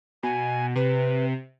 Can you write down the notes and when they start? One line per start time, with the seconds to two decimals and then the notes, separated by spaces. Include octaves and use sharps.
0.23 B2 G#5
0.76 C3 B4